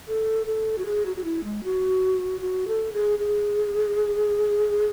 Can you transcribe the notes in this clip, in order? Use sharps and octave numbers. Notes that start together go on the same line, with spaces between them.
A4
A4
F#4
G#4
F#4
F#4
E4
G#3
F#4
F#4
A4
G#4
G#4